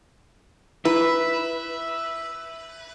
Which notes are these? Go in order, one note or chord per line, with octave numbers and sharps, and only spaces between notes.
E4 B4 E5